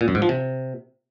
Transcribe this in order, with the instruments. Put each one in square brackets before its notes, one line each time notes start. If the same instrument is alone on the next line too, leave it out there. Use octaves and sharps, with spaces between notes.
[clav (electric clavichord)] A#2
F#2
G#2
F3
C3